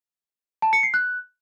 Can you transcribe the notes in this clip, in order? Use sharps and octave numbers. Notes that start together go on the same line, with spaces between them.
A5
C#7
C7
F#6